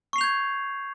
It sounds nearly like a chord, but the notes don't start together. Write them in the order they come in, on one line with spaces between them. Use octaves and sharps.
C#6 C7 F7 G6 G#6